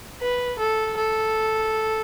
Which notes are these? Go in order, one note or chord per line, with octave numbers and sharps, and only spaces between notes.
B4
A4
A4